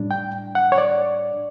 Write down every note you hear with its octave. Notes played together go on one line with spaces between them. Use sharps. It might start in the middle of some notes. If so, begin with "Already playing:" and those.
Already playing: A2 G3 D4
G5
F#5
C#5
D5